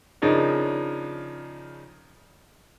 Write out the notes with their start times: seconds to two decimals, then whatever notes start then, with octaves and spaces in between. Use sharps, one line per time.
0.22 C#3 F3 D4 D#4 A#4 C#5